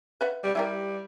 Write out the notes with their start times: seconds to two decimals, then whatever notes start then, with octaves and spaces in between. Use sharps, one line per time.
0.21 B4 E5 F#5
0.43 G3
0.55 G3 E4 G4 A#4